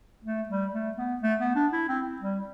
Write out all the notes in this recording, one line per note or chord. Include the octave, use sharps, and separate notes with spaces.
A3
G3
A3
B3
A3
B3
D4
E4
C4
G3